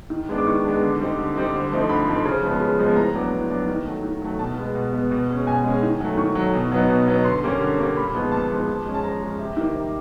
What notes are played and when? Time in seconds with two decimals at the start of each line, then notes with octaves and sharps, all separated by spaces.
0.10 D#3
0.29 G#3 B3 D4
0.38 D6
0.47 D#3 C#6
0.64 G#3 B3 D4
0.83 D3
1.00 G3 C4 D#4
1.19 D3
1.36 G3 C4 D#4
1.54 D3
1.72 F3 A3 C4 D#4
1.89 D3 B5
2.07 F3 A3 C4 D#4
2.26 C#3
2.43 F3 G#3 B3
2.61 C#3
2.79 F3 G#3 B3
2.96 A2 A#5
3.14 F#3 B3 D4
3.33 A2
3.50 F#3 B3 D4
3.68 D#3
3.86 F#3 A3
4.03 D#3
4.22 F#3 A3
4.39 B2 A5
4.57 G#3 B3
4.75 B2
4.92 G#3 B3
5.11 B2
5.28 G#3 C#4
5.47 B2 G#5
5.64 G#3 C#4
5.83 D#3
6.00 F#3 A3
6.17 D#3 C#6
6.35 F#3 A3
6.53 B2
6.72 F#3 B3 D#4
6.89 B2
7.07 F#3 B3 D#4
7.25 D3 C6
7.43 G3 A#3 C#4
7.60 D3
7.78 G3 A#3 C#4
7.96 A#2 B5
8.15 F3 G#3 B3 D#4
8.32 A#2 A5
8.51 F3 G#3 B3 D#4
8.69 F3
8.85 G#3 C#4
8.94 A5
9.03 F3 A#5
9.21 G#3
9.26 C#4
9.39 C3
9.57 D#3 G3 A#3
9.75 C3